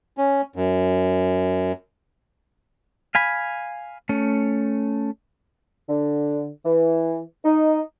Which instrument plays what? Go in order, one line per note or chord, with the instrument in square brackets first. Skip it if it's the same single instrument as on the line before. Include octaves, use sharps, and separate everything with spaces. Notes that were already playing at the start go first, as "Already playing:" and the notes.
[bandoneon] C#4
F#2
[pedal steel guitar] F5 G#5 B5
A3 C#4
[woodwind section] D3
E3
D#4